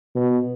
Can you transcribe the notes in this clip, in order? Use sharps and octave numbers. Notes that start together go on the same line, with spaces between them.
B2